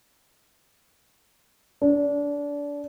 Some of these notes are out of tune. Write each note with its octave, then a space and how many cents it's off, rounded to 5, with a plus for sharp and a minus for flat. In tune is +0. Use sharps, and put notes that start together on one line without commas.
D4 -25